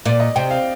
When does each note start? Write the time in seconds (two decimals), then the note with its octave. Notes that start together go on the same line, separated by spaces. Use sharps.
0.06 A#2 D5
0.20 D#5
0.36 C3 G5
0.51 F5